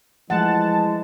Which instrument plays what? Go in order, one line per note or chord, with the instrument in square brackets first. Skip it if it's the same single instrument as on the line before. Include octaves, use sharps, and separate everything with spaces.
[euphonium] E3 [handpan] F3 A3 F#5 [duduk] G#3 [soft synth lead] A5